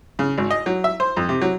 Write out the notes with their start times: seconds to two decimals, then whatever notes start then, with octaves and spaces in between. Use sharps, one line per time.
0.19 C#3
0.38 G#1
0.51 D#5
0.66 F#3
0.84 E5
1.00 C5
1.17 F2
1.29 C3
1.41 F#3